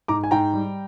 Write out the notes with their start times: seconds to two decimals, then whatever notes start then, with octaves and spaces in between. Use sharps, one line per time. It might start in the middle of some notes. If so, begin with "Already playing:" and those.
0.08 G#2 A#5 D6
0.24 G#5
0.31 G#2 G5 A#5
0.54 G3